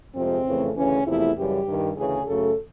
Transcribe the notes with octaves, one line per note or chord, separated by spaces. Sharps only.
F2 C3 F3 G#3 C4
F2 C#3 E3 A3
D2 C#3 E3 C#4
E2 C3 F3 A3 E4
F#2 C#3 E3 G3 G4
G2 D#3 G3
D2 C#3 E3 G#4
F#2 C#3 F#3 A3 A4